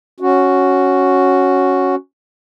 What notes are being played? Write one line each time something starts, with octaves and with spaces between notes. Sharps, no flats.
C#4 F#4